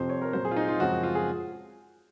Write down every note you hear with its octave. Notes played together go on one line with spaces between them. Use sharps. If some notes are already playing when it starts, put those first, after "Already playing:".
Already playing: F2 C3 F3 C4 C5
C#5
A#4
A#2 F#3 C4 C5
G#4
F4
D#4
F4
F#2 C#3 F3 G#3 C4 F#4
F4
G#4